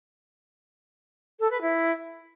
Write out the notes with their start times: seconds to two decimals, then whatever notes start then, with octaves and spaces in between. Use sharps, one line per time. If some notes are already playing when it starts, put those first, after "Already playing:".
1.39 A4
1.50 B4
1.61 E4